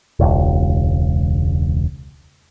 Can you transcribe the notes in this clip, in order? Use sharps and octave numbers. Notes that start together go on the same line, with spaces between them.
E1 C#2